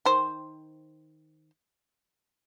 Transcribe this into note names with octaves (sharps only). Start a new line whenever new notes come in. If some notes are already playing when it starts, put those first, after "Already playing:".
D#3 C5